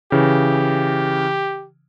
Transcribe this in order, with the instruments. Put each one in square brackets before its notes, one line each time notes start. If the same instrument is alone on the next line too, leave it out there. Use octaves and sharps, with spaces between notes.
[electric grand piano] C#3 E3 [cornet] G4